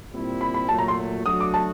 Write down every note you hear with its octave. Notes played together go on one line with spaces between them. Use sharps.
A#2 G3 C4 E4
B5
B5
A#2 F#3 A3 A5
A#5
C6
F#3 A3 D4 F#4 D#6
D6
A5